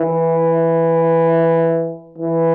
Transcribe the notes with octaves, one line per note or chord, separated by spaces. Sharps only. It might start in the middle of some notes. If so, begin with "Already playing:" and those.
Already playing: E3
E3